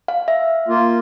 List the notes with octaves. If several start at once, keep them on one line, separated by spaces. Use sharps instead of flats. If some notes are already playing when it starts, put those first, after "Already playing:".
F5
E5
A#3 F4